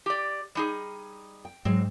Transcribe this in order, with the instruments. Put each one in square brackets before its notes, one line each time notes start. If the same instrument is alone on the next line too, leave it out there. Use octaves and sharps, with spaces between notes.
[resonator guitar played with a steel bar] G4 D5
G3 D#4 G#4
[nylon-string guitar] G5
[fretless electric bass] G#2 [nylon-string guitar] F#3 G#3 G#4 [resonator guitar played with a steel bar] C4